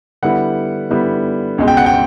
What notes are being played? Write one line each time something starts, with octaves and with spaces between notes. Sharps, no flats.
D3 G3 B3 E4 F#5
D3 G3 B3 E4
C#2 B2 G#3
G5
F#5
G5